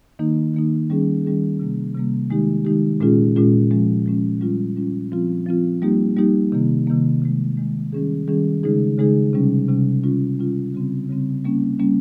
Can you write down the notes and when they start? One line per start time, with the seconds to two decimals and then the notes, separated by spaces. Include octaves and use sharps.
0.19 D#3 A#3 D#4
0.54 D#3 A#3 D#4
0.90 D#3 G3 C#4 G#4
1.24 D#3 G3 C#4 G#4
1.60 C3 G3 A#3
1.95 C3 G3 A#3
2.30 D#3 G#3 D#4 G4
2.65 D#3 G#3 D#4 G4
3.00 A#2 G#3 C#4 F4 G#4
3.36 A#2 G#3 C#4 F4 G#4
3.71 F3 G#3 C#4
4.06 F3 G#3 C#4
4.41 G3 C#4 F4
4.76 G3 C#4 F4
5.12 F3 C4 F4
5.46 F3 C4 F4
5.82 G3 A#3 D#4 G4
6.17 G3 A#3 D#4 G4
6.52 C3 D#3 A#3
6.87 C3 D#3 A#3
7.22 C3 D#3 G#3
7.58 C3 D#3 G#3
7.93 D#3 G3 C#4 G#4
8.28 D#3 G3 C#4 G#4
8.63 C#3 G#3 D#4 G#4
8.98 C#3 G#3 D#4 G#4
9.33 C3 G3 C#4
9.68 C3 G3 C#4
10.04 G3 C#4 F4
10.39 G3 C#4 F4
10.74 C#3 G3 C4
11.10 C#3 G3 C4
11.45 G3 A#3 C#4
11.79 G3 A#3 C#4